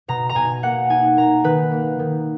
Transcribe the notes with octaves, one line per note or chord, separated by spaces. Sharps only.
B2 A#5
A#5
B2 G#5
A#3 F#5
D#4 G#5
A#3 A#5
D#3 B4
A#3
D#3